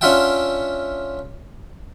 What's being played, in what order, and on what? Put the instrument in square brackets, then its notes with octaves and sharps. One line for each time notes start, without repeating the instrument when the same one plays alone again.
[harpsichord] C#4 D4 F4 E5 F#5 G5